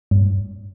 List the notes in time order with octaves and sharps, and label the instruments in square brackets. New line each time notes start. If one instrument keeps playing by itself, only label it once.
[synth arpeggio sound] G2